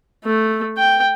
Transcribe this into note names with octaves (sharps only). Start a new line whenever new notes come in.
A3
G5